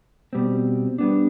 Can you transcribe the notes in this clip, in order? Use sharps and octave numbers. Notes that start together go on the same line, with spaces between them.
B2 G3 C4
G3 B3 D4